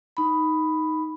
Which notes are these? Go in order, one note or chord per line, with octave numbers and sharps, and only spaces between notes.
D#4 B5